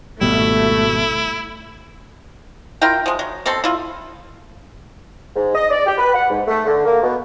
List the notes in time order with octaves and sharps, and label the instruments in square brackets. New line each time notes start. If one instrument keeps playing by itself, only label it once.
[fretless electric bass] G#1 B2 G3 [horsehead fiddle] A3 [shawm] E4
[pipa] E4 F4 A#4 G5
F3 G#3
F#3
B2 C4 A4 C6
E4 F4
[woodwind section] G#2
D#5
D5
G4
B4
F#5
G#2
A3
D3
A#3
B2